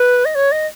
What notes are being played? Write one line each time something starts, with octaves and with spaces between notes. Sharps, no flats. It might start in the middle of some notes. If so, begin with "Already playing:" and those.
Already playing: B4
D#5
C#5
D#5